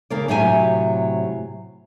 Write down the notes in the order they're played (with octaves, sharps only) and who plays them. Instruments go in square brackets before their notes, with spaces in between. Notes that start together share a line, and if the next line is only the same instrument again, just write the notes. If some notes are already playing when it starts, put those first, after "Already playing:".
[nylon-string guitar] C#3 A#3 D5
A2 C3 F#3 E4 G4 G#5